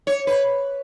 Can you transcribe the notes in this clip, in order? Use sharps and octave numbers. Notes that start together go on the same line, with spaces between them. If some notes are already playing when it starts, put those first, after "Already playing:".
C#5
B4